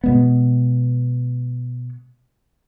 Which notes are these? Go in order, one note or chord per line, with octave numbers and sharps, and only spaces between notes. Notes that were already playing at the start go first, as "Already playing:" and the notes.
B2 G#3 B3